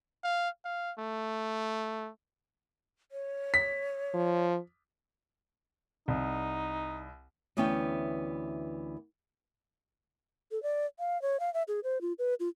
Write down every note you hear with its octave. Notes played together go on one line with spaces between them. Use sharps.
F5
F5
A3
C#5
B6
F3
C2 D#4
D2 E3 B3 C#4 B4 G5
A4
D5
F5
C#5
F5
E5
G#4
C5
F4
B4
F4